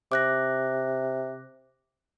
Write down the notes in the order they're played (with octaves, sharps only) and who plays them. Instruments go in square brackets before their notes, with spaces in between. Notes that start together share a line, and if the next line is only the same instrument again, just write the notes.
[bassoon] C3 [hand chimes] D6 F#6 A#6